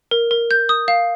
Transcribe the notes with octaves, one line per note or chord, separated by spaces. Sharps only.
A#4
A#4
G6
D#6
F5